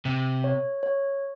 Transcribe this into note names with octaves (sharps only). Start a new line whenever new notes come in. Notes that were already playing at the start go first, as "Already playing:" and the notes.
C3
C#5
C#5